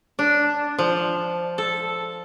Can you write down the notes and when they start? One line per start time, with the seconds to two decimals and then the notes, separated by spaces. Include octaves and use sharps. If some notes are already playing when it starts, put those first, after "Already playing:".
0.19 D4
0.78 F3
1.58 A4